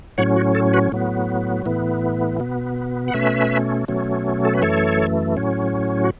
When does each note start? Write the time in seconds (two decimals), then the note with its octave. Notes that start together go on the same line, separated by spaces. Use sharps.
0.18 A2 F#3 C#4 C#5 F#5
0.36 F#4
0.55 A4
0.73 F#4 B4
0.92 A2 F#3 B3
1.66 A2 E3 B3
2.40 B2 B3
3.08 F#5
3.14 B2 A3 C#4 B4 E5
3.88 B2 F#3 A3 C#4
4.45 A4
4.54 B4
4.62 F#2 E3 A3 A4 C#5
5.37 A2 F#3 C#4
6.04 F#4